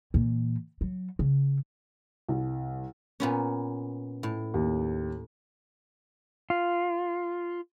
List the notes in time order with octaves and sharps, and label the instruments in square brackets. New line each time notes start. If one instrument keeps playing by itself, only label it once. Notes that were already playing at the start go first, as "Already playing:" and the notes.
[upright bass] A#2 E3
F#3
C#3
[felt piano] C2
[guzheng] A#2 B3 C#4
A2
[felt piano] D#2
[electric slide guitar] F4